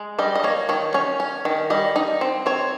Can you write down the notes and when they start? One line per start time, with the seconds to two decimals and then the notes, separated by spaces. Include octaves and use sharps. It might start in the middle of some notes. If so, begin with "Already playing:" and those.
Already playing: G#3
0.19 G3 D#5
0.35 D#5
0.44 A#3 C#5
0.69 D#3 C#5
0.94 C#4 C#5
1.20 C#4
1.45 D#3
1.70 G3 D#5
1.96 D#4
2.21 C4
2.46 C4 C#5